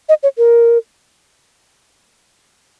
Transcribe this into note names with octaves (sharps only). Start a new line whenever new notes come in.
D#5
C#5
A#4